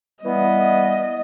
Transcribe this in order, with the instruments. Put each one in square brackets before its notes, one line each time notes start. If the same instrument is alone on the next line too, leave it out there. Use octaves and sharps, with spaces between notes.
[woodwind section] E3 G3 B3 [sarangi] D#5